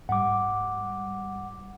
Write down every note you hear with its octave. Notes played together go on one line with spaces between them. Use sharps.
G#2 G3 F#5 D6